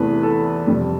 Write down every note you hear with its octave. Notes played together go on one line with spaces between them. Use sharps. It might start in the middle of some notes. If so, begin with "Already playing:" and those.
Already playing: E2 C3 E3 A3 B4
A4
F2 C3 G3